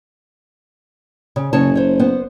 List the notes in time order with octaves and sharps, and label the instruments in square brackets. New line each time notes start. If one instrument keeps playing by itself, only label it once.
[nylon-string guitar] C#3
[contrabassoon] F#1 [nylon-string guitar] C#3 C#5 A5
[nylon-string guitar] C5 C#5
B3 C5